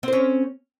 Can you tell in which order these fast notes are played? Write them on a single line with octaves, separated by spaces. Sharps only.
C4 C5 C#4